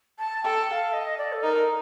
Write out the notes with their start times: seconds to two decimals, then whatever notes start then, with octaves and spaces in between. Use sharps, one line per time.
0.19 A5
0.44 A4 G5
0.68 G5
0.72 F5
0.93 D#5
1.18 D5
1.33 A4
1.43 D#4 A#4